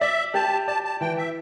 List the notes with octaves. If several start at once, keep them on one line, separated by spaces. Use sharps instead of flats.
D5 E5
G4 A5
D5 A5
A5
E3 G5
E5